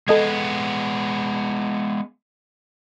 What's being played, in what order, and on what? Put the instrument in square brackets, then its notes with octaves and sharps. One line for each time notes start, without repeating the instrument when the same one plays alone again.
[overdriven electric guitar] G#3 B3 [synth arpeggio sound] A4 D#5 G#6